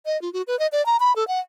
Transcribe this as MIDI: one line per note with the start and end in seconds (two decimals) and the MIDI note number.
0.06 0.20 75
0.22 0.32 65
0.33 0.42 66
0.47 0.58 71
0.59 0.67 75
0.72 0.85 74
0.86 0.97 82
1.00 1.15 83
1.16 1.27 69
1.28 1.40 78